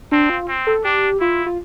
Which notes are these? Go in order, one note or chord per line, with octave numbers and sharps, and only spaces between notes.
C4 D4
F4
C4
A4
D4 G4
E4 F4
F4